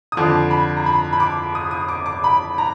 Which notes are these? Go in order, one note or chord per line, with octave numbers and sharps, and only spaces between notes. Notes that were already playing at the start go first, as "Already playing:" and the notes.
D#6
F2 D3 F3 D6
B5
A#5
B5
B5
D6
D#6
D#6
D6
D6
B5
A#5